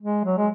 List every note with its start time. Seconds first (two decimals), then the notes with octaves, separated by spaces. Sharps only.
0.01 G#3
0.24 F#3
0.37 G#3